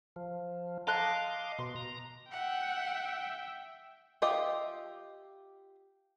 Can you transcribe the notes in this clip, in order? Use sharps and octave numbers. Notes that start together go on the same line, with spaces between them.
F3
D#5 F5 A5 C6 D6 F#6
B2 C6
A#5
E5 F#5 G5
F4 G4 D#5 E5